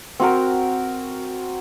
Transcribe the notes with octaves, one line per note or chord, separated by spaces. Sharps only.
C4 F#4 A#4